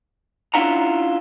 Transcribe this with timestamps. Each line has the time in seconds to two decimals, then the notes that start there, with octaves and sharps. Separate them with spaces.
0.54 C#4 D4 E4 F4 F#5 A#5